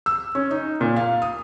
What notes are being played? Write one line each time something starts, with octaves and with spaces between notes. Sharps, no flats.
E6
C#4
D#4
A#2
F5
D#6